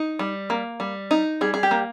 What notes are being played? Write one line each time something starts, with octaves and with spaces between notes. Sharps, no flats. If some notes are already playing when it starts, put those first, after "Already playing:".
Already playing: D#4
G3
A#3
G3
D#4
G3 G#4
G#4
G4
A#3